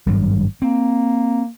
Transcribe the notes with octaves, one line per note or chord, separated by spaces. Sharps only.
G#1 G2 F#3
A#3 C4